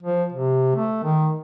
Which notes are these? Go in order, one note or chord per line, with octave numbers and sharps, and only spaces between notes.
F3
C3
A3
D#3